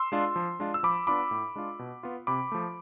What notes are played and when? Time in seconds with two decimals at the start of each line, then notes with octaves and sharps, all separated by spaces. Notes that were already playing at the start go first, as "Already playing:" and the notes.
Already playing: C6 E6
0.12 G#3 D4 F4
0.36 F3
0.60 G#3 D4 F4
0.74 E6
0.83 F3 B5 D6
1.07 B3 D4 F4 B5 D6
1.31 A2
1.56 G#3 D4 F4
1.79 B2
2.03 B3 F4
2.27 C3 B5 D6
2.52 F3 A3